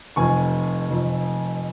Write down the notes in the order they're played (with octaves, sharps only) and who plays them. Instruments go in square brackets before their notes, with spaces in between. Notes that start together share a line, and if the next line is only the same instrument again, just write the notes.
[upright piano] F1 F2 F3 G#5 C#6
F1 F2 F3